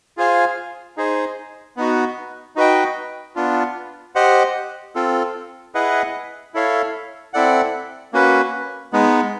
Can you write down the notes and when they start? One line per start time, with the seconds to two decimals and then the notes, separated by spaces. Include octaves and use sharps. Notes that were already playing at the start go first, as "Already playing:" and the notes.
0.17 F4 G#4 C5 F5 G#5
0.97 D#4 G#4 C5
1.77 B3 D#4 F#4
2.56 D#4 F#4 B4 D#5 G5
3.36 B3 D4 F4
4.15 G4 C5 D#5 F#5
4.95 C4 F4 A4
5.75 E4 G#4 B4 D#5 F#5
6.54 E4 A4 C#5 F5
7.34 C4 E4 A4 D5 F#5
8.13 A#3 C#4 F#4 B4
8.93 G#3 B3 D#4